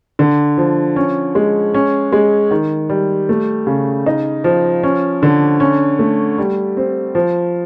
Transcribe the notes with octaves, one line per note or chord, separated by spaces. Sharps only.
D3
F3
C#4
G#3
C#4
G#3
D#3
G3
A3
C#3
D#4
F3
C#4
D3
C#4
A3
G3
C4
F3